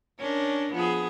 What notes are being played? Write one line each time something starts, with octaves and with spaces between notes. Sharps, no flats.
C#4 D4 A#4
F3 B3 G#4